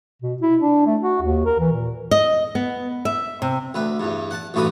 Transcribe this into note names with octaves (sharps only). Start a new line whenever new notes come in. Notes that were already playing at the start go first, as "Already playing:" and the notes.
B2
E4
D4
A3
F#4
D#2
A#4
E3
A#2
D#5
B3
E5
C3
D2 B4
E2 G2
F#5 A5
A1 D2 G2 F#4 B4 D#6